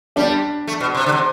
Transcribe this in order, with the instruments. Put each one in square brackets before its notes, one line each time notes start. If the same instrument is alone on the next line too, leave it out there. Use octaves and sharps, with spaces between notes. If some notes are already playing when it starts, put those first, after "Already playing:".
[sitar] G3 [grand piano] D4
[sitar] A3
B2
C3
D3
C3